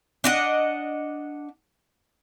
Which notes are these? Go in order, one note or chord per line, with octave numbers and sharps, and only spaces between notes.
D4 D#5 F#5